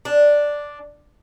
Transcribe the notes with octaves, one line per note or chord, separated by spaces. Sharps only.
D4